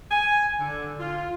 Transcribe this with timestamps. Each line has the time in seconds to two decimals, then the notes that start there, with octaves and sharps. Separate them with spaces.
0.11 G#5
0.59 D3
0.99 F4